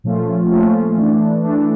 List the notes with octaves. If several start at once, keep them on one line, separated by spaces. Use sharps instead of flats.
A#2 F3 A3 C#4 F4
A#2 F3 A3 C#4 F4
E3 A3 D4
E3 A3 D4